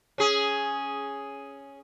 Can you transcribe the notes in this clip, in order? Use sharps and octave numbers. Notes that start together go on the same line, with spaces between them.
C#4 G#4